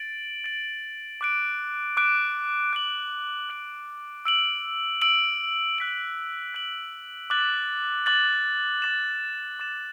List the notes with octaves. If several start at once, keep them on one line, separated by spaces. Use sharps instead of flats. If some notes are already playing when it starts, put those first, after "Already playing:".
Already playing: A6 D7 F#7
A6 D7 F#7
D6 F#6 D7
D6 F#6 D7
F#6 D7 F#7
F#6 D7 F#7
E6 D7 F#7
E6 D7 F#7
F#6 B6 D7 F#7
F#6 B6 D7 F#7
D6 F#6 A6 F#7
D6 F#6 A6 F#7
D6 A6 E7
D6 A6 E7